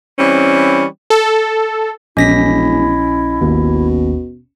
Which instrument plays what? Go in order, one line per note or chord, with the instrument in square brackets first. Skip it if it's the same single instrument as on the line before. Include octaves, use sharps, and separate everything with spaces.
[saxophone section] E3 G3 C4 C#4
[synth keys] A4
[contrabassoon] E1 [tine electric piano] A#1 D#5 [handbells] C#4 A#6 B6 [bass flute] E4
[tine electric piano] G#1 D#2 [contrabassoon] B2